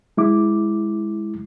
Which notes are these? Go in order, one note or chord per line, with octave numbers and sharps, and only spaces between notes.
G#3 E4 D6